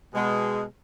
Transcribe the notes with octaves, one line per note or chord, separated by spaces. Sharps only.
B2 G#3